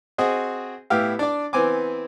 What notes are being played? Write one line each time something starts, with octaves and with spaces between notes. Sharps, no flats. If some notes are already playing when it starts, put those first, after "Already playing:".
C4 F#4 G#4 D#5
A2 B3 E4 G4 F5
D4 D5
E3 B3 C4 G#5 D6